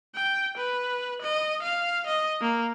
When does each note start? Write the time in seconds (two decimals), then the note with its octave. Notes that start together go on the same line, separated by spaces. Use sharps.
0.15 G5
0.57 B4
1.22 D#5
1.63 F5
2.07 D#5
2.41 A#3